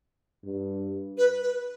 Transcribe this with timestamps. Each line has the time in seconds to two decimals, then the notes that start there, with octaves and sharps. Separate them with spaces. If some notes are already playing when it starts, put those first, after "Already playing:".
0.44 G2
1.18 B4
1.43 B4